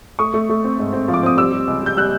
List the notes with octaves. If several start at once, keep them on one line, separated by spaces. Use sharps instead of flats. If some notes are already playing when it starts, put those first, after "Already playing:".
A3 C#6 D#6
A3
A3
C4
G#2
C4
F3
D6
C4 D#6
G3 D6 E6
G3
C#2
G3 G6
G3 E6 F#6